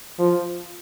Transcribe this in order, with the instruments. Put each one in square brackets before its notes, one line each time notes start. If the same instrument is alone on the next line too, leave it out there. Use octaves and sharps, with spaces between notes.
[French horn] F3